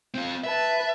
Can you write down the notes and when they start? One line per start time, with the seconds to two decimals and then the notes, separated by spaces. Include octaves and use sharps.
0.14 C4 F4
0.44 B4 E5 A5